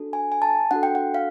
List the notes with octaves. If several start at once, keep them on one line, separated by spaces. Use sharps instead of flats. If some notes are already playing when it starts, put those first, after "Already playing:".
Already playing: D4 F#4 A4
G#5
G#5
A5
D4 F#4 A4 F#5
G5
F#5
F5